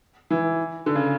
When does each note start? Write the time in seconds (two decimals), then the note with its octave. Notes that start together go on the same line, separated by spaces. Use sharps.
0.30 E3
0.86 D3
0.95 C#3